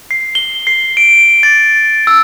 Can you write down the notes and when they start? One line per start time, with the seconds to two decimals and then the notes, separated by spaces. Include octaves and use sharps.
0.11 C7
0.35 G7
0.67 C7
0.97 D7
1.43 A6
2.07 E6